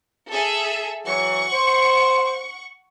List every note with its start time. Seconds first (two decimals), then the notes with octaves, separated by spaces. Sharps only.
0.31 G#4 A4 E5
1.06 E3 F#3 F#5 C#6
1.53 C5